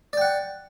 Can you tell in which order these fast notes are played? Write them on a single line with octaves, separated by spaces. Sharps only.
D5 G5 F#5